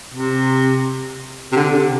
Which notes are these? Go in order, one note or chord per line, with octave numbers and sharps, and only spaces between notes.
C3
C3
D3
C3